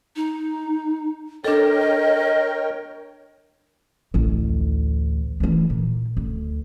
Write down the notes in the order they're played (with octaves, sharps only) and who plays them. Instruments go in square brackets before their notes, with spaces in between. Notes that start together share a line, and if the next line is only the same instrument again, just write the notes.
[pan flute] D#4
[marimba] D4 A4 [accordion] A#4 C#5 G5 [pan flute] D#5
[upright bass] A1 D2
E3 A3
A#2
D2